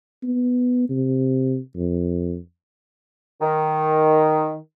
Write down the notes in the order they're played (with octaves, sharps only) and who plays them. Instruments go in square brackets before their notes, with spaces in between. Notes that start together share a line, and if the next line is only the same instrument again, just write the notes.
[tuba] B3
C3
F2
[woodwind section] D#3